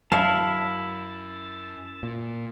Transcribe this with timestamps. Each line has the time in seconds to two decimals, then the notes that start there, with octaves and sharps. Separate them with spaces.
0.12 F#2 E4 F5 A5
2.03 A#2